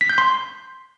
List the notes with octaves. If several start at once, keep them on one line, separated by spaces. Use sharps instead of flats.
B6
G6
C6